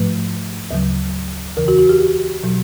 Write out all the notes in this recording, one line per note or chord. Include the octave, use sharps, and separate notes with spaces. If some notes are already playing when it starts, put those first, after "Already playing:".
Already playing: G#2 F3 A3 B4
D2 C#3 F#3
E2 C#3 E3 A#4
F#4
F#4
G4
G4
B2 F#3